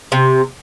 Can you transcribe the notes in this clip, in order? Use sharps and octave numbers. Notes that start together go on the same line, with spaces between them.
C3